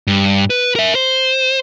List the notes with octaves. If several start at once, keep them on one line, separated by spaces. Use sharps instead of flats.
G2
B4
A#4 E5
C5